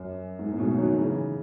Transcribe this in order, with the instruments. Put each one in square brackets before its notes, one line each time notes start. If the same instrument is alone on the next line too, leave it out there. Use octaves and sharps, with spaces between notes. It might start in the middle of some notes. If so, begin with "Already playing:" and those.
Already playing: [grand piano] F#2
G#2
A2
G#2 B2
D#3 F#3
C#3 E3